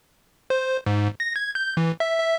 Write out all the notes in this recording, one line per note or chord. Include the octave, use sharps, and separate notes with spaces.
C5
G#2
A#6
G#6
G6
E3
E5
E5